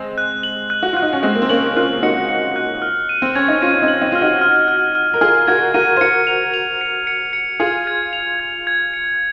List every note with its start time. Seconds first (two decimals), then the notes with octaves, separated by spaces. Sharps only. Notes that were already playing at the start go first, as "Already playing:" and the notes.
Already playing: G#3 C4
0.18 F#6
0.43 F#7
0.70 F#6
0.83 F#4
0.93 F4 F#6
1.02 D#4
1.13 C#4
1.23 G#3 C4 F#6
1.35 A#3
1.42 C4
1.49 A#3 C#4 F#7
1.76 C#4 F4 F#6
2.03 D#4 F#4 C#7
2.29 C#7
2.56 F#6
2.82 F6
3.09 D#7
3.22 C4
3.35 C#4 G#6
3.48 D#4
3.62 C#4 F4 D#7
3.74 C#4
3.82 C4 D#4
3.88 F#7
4.01 C4 D#4
4.12 F4 F6
4.21 D#4 F#4
4.41 F6
4.68 F6
4.95 F6
5.14 A#4
5.21 F4 G#4 F6
5.47 F#4 A#4 G#6
5.74 F#4 A#4 D#7
5.97 C5
6.01 F#4 A#4 C#7
6.27 F7
6.54 F7
6.81 C#7
7.07 C#7
7.33 C#7
7.60 F4 G#4 G#6
7.87 G#6
8.13 F7
8.40 G#6
8.67 G#6
8.94 C#7